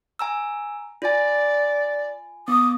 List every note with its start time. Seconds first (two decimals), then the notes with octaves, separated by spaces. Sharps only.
0.19 G#5 A#5 E6
1.02 F4 D5 G#5
2.48 B3 D6 D#6